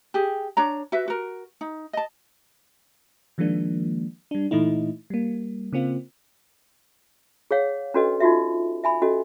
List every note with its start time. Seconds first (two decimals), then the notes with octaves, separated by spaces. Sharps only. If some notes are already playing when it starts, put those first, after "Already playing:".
0.14 G4 G#4
0.57 D4 C#5 A#5
0.92 F#4 B4 E5
1.08 F#4 A#4
1.61 D#4
1.93 D#5 A5
3.38 D#3 F3 G#3 A#3 D4
4.31 G3 D4
4.51 A#2 E3 A3 D#4 E4
5.10 G3 A#3
5.72 C#3 A#3 C4 F4
7.51 G#4 C#5 F5 F#5
7.94 C#4 D4 F#4 A4 B4 D#5
8.20 D#4 F4 F#4 E5
8.84 E5 G#5 B5
9.02 C#4 F#4 A4 D#5